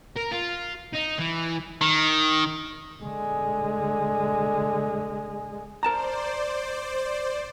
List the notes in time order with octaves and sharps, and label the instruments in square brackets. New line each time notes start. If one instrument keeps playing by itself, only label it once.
[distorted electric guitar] A#4
F4
D#4
E3
D#3
[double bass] D3 G#3
[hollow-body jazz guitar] A#4 A5 A#5 [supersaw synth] C5 D5